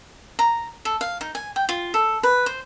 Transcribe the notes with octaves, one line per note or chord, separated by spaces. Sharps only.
A#5
A4
F5
D#4
G#5
G5
F4
A4
B4
C5